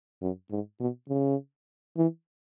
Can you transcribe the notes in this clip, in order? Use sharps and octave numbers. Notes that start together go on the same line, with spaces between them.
F#2
G#2
B2
C#3
E3